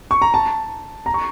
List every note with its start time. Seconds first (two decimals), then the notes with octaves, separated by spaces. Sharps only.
0.11 C#6
0.22 A#5
0.34 A5
1.06 A#5
1.14 C#6